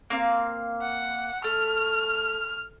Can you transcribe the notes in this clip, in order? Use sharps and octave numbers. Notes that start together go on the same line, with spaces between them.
A#3 C4 F5
F#5
A3 F6